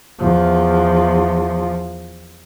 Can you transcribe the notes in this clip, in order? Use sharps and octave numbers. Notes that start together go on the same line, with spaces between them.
E2 F3